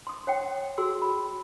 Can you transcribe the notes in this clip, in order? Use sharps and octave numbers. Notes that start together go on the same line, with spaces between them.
C6 D#6
C#5 F#5 G5
F#4 G#4 C6 E6
B5